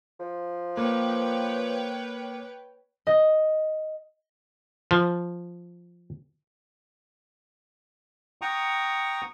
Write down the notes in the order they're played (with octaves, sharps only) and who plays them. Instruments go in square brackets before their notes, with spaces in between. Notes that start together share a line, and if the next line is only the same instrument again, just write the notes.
[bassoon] F3
[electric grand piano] A#3 [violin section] B4 C#5 G5
[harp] D#5
[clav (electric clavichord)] F3
[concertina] F#5 G5 A#5 C#6 D#6